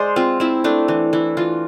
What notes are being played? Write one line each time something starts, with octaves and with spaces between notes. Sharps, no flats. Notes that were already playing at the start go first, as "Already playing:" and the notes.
Already playing: G#3 C5 D5
C4 F4
C4 E4
A3 D4
E3
E3 E4
E3 F4